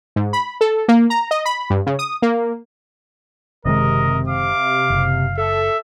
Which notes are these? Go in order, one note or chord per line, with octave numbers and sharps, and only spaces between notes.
G#2
B5
A4
A#3
A#5
D#5
B5
G2
C#3
D#6
A#3
F#1 C3 D#3 G#3 A#4 D#5
F5 D6
F#1
A4 E5